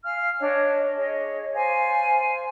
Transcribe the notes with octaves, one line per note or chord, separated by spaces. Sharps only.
F5 G#5 F6
D4 C#5 D#5
G#4 C#5 D#5
C5 D5 F5 G#5